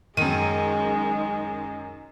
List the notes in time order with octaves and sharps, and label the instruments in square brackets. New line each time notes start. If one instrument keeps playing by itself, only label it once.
[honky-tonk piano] F#2 D#7 [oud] D#3 [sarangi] G#3